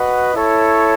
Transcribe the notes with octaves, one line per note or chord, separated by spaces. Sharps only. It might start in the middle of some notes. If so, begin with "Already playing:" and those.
Already playing: F#4 B4 D#5 F#5
E4 A4 C#5